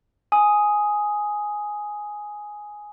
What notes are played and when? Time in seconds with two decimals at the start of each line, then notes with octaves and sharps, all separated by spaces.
0.32 G#5 D#6